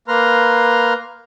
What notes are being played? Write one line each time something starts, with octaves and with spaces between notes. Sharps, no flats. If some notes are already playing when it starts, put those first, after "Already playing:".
A#3 B4 A#5 C6 F6